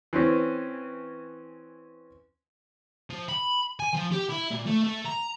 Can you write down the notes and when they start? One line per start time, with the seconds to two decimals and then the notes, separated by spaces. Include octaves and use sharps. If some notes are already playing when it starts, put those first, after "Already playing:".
0.13 E3 C4 C#4
3.10 F3
3.29 B5
3.80 G#5
3.94 F3
4.12 G4
4.30 E4
4.51 A#2
4.66 A3
4.84 A3
5.05 A#5